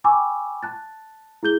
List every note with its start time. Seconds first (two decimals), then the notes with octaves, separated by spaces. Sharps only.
0.04 G5 G#5 B5 C#6 D6 E6
0.63 A5 F#6 A6
1.43 E4 G#4 G6 G7